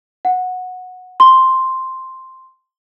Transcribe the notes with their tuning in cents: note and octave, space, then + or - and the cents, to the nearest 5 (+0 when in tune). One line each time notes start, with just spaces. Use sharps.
F#5 -15
C6 +0